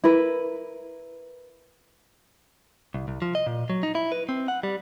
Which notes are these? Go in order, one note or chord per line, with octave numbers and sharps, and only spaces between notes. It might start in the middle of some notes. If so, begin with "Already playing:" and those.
E4 A#4 B4
C2
C2
F3
D#5
A#2
F#3
D#4
E4
B4
C4
F#5
G3